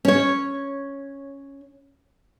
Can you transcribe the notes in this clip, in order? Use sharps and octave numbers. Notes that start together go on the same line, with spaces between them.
C#4 C#5